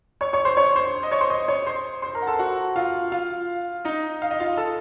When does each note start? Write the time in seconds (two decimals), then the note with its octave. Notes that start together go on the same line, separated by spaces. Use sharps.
0.21 C#5 C#6
0.33 C#5 C#6
0.45 C5 C6
0.57 C#5 C#6
0.76 C5 C6
1.03 D#5 D#6
1.11 C#5 C#6
1.21 C5 C6
1.30 D#5 D#6
1.48 C#5 C#6
1.66 C5 C6
2.02 C5 C6
2.15 A#4 A#5
2.22 F#5
2.27 A4 A5
2.39 F#4 F#5
2.76 F4 F5
3.12 F4 F5
3.85 D#4 D#5
4.22 F5
4.31 D#5
4.40 F4 F5
4.57 A4 A5